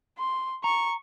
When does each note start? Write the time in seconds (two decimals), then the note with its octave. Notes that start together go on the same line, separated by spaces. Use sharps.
0.18 C6
0.64 A#5 C#6